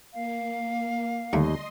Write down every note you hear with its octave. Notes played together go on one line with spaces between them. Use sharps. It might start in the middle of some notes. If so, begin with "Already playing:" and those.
A#3 F5
D#2 D3 G3 A3 D#5 C6